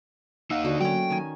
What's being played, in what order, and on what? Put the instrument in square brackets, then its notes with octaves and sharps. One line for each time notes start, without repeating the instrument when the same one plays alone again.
[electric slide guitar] A#3 D#4 D#5 [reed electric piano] F5 F#5 E6
[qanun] D3 F#4
[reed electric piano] F#3 A#3 F#4 [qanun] A3 C#4 [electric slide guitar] G5
[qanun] D#3 G#5